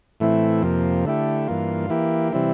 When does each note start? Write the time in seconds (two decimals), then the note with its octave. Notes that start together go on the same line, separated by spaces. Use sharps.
0.20 A2 E3 A3 C4 E4
0.63 F2 C3 F3 A#3
1.05 D3 A3 E4 G4
1.48 G2 E3 A#3 F4
1.90 E3 A#3 E4 G4
2.32 C3 E3 G3 C4 E4